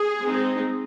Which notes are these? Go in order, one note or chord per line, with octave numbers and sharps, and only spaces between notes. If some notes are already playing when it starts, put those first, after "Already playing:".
Already playing: G#4
G#3 C4 D#4